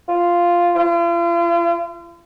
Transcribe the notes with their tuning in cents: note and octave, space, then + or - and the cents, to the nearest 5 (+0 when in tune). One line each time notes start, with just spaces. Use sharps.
F4 -5
F4 -40